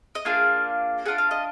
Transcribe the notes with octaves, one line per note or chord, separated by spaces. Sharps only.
D#5
A#3 D4 F4 G#4 F5
D4 F4 G#4 F#5
F5
D#5